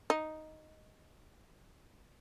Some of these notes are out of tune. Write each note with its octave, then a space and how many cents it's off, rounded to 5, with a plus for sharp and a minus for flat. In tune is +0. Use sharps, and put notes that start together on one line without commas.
D#4 +0 D#5 +0